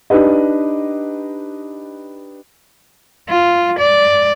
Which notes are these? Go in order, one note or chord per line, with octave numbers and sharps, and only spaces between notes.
D4 D#4 G4 B4 D#5
F4
D5